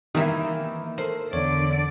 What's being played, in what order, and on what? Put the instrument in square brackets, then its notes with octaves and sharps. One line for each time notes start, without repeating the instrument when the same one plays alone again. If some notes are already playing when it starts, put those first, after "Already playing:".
[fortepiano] D#3 [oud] E3 A#3 E5
[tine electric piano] A4 A#4 [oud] C5
[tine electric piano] E2 C#5 [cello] D3 D5